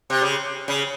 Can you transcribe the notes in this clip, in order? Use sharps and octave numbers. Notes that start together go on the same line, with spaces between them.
C3
C#3
C#3